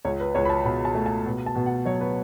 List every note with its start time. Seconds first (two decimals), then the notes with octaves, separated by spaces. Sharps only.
0.05 C#2 C#5
0.20 B4
0.35 C#2 C#5
0.45 B5
0.49 A5
0.65 B2 B5
0.85 A5
0.95 A3
1.06 A5
1.26 B2
1.46 A5
1.55 B2
1.66 F#5
1.85 F#3 C#5
2.01 B4